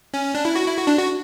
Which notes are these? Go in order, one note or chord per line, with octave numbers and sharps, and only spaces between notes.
C#4
D4
E4
F#4
E4
F#4
D4
F#4